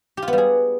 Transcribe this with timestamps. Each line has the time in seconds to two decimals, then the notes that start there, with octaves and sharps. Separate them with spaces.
0.17 G4
0.22 F4
0.28 B3
0.33 G3
0.38 G#4